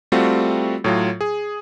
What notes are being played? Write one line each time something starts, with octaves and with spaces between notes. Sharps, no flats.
G3 A3 C4 F4 F#4
A2 F#3 F4
G#4